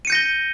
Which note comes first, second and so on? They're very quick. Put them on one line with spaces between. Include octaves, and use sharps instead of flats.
D#7 C#7 G6 A#6 G7